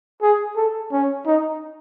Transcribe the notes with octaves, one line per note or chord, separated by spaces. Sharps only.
G#4
A4
C#4
D#4